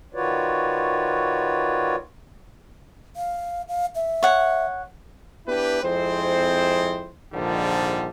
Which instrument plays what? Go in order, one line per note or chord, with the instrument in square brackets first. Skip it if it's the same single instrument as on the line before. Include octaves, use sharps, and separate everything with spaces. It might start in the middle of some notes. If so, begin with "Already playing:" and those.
[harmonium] D#3 F4 F#4 B4 C#5 D5
[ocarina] F5
F5
E5
[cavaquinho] C#5 F#5
[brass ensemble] B3 D4 E4 G4 B4
F2 G#3 C4 E4 C5
A#1 G#2 D3 D#3 F3 G3